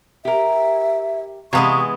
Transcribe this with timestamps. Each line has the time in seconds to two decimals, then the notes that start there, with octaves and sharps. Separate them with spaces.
0.25 G4 A#4 E5
1.53 C3 E3 G#3 B3 G4 F5 C#6